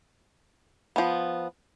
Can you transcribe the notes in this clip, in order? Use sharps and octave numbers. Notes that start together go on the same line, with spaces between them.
F3 B3